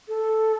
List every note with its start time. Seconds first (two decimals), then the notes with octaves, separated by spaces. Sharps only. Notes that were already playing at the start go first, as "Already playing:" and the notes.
0.08 A4